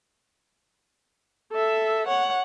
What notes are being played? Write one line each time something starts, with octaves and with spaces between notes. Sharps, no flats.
A4 E5
C#5 F#5